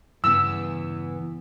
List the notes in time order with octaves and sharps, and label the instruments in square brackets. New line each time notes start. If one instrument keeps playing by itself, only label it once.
[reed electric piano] G2 C#3 [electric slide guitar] E3 B3 [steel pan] E6